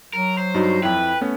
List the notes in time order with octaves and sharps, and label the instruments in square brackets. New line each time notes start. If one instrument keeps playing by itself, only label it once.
[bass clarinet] F#3 [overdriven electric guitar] A#4
[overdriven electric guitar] C5
[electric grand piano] G2 D#4 [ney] F#4
[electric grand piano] F2 E4 [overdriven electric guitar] B4 [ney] G5
[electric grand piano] A3 B3 C#4